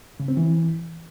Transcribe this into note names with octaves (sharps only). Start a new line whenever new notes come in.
C#3
C4
E3